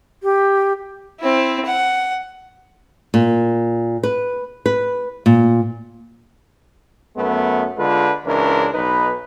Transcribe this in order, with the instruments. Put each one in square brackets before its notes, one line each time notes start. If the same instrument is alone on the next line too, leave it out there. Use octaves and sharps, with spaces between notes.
[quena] G4
[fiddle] C4 E4
F#5
[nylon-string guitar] A#2
B4
B4
A#2
[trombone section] F#2 A3 B3
D3 G#3 F4 A4 B4
C#2 E3 C#4 D4 A#4
B1 D#4 B4